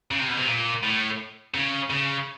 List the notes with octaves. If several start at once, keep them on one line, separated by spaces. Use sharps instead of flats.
C#3
C3
B2
C3
A#2
A2
C#3
C#3